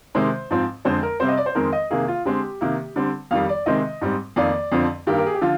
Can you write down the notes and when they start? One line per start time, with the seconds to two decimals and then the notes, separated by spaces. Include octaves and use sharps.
0.15 C3 D#3 G#3 C5
0.51 G#2 F3 C4
0.85 F2 D3 G#3 C4 C5
1.03 A#4
1.20 C3 G3 C4 C5
1.28 D#5
1.37 D5
1.46 C5
1.55 F2 D#3 G#3 C4 A#4
1.73 D#5
1.90 C3 D#3 A#3 G#4
2.08 F4
2.25 D3 G#3 C4 G4
2.61 C3 D#3 A#3
2.96 D3 G3 C4
3.31 F2 D#3 G3 F5
3.49 D5
3.66 C3 D#3 G#3 C4 D#5
4.01 G#2 G3 C4
4.36 F2 D#3 A#3 D5
4.72 F2 D3 F3 C4
5.07 G2 D#3 A#3 G4
5.18 A#4
5.26 G#4
5.34 G4
5.41 D3 F3 F4